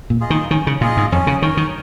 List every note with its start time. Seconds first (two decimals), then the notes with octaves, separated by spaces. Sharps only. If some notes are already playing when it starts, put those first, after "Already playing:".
0.10 A#2
0.21 F4 G#4 D#5
0.30 D#3
0.50 D#3 C#4
0.67 C#3
0.81 A#2 F4 G#4 D#5
0.97 G#2
1.12 F2 C#4
1.27 C#3
1.42 D#3 A#4 C#5
1.57 D#3